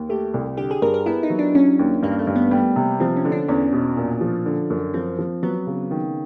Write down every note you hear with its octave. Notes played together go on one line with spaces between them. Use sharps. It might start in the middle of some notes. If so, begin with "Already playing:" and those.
Already playing: D#2
A3 G4
C2
D3 G4
G#4
G2 A#4
A#4
B3 E4
D#4
F#3
D4
F#3 C#4
D#2
G2 A#3
A3
G2
B3
G3 B3
C3
F3 C4
C#4
D3
D4
E2 C#4
B2
A#2
F3
D3
F#2
F3 C4
F3
F#3 B3
C#3
D#3